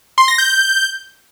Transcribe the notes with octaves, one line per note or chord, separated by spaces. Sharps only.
C6
A#6
G6